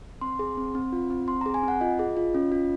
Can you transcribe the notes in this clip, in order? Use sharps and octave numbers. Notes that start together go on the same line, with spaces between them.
C4 C6
G#4
C4
C4
F4
C4
C4 C6
G#4 A#5
G#5
C4 F#5
F4 D#5
G#4
F4
C#4
F4